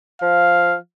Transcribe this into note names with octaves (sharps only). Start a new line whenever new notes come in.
F3 F5